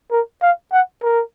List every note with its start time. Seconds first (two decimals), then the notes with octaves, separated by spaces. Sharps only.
0.11 A#4
0.42 F5
0.72 F#5
1.03 A#4